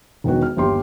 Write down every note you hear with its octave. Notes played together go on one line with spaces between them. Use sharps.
E1 D#3 B3 F#4
F6
G1 D#2 G4 C6